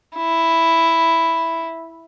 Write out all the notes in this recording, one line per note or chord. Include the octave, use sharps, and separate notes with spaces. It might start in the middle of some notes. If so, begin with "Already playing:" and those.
E4